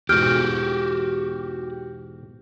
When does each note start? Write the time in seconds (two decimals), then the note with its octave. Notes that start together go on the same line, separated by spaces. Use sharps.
0.09 E2 G#2 B2 F#4 G4 F6 G6 D7